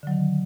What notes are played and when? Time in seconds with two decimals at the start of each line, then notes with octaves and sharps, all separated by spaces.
0.03 D3
0.07 F#3
0.11 D#3